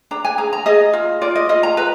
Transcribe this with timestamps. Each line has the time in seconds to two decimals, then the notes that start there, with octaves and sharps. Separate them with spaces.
0.11 D4 A#5
0.25 G#5
0.38 G#4 A#5
0.53 A#5
0.66 G#4 D#5
0.93 F4
1.21 F4 D5
1.35 D#5
1.49 F4 D#5
1.63 A#5
1.77 B4 A#5